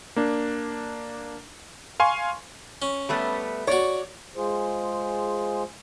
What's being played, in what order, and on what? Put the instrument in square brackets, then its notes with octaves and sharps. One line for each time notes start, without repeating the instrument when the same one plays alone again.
[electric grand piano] A#3 D4
F5 G#5 C6 C#6
[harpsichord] C#4
[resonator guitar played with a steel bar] G3 A3 B3
[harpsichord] F#4 A#5 [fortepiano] C#5 [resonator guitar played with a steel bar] D5
[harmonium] G#3 F4 G#4 C5